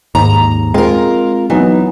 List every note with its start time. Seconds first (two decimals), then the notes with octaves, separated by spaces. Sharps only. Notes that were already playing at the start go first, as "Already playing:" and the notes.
0.15 D#2 G#2 A#5
0.74 G#3 C4 F4 A#4
1.50 E3 F#3 B3 D#4